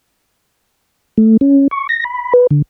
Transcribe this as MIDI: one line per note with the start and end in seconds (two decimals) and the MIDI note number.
1.18 1.37 57
1.41 1.68 61
1.71 1.87 85
1.89 2.04 94
2.04 2.33 83
2.33 2.47 71
2.51 2.62 50